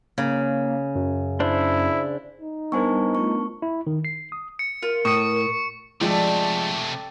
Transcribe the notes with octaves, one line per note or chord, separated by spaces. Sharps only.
C#3 A#3
F#2
D4 E4 C5
D#4
G3 B3 D4 A#4 C5 G#5 C#6
A3 F4 C#6
E4
D#3
C7
D#6
C#7
F4 A#4
A2 C#6 D#6 C#7
C3 F3 G#3 A3 A4 D5 G5